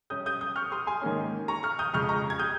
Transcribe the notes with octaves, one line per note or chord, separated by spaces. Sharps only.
C3 G3 C#4 D#6 G6
D#6 G6
D#6 G6
C#6 F6
C6 D#6
G#5 C6
G#2 D#3 A#3 C#4
A#5 C#6
C#6 F6
D#6 G6
F2 C#3 G#3 C#6 F6
A#5 C#6
G#6
D#6 G6